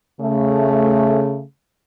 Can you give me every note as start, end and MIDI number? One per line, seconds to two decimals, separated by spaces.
0.21 1.42 49
0.21 1.42 57